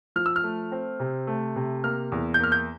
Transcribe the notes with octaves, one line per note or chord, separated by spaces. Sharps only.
F3 F6
E6
F6
A3
C4
C3
A3
C3
A#3 F6
E2
G6
A#3 F6
G6